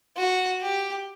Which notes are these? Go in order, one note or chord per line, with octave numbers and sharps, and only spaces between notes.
F#4
G4